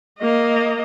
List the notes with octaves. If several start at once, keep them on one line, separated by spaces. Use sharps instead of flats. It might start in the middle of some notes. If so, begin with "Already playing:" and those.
A#3 D#5